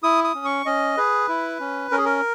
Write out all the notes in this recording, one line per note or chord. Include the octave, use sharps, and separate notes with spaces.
E4 D#6
D#6
C#4
C#6
C#4 D#5
G#4 B4
E4
C#4
C#4 A#4
G#4
A#4